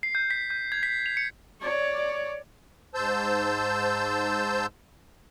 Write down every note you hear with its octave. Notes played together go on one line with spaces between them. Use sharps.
C7
G6
B6
G6
G#6
B6
F7
C#7
C#5 D5
G#2 C5 A5 E6 G6